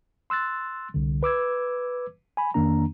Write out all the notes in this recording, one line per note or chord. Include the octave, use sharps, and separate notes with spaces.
C6 E6 F#6 A6
C2 D3
B4 D6 E6 G#6
G#5 B5
F2 D#3 A#3 D4 A#5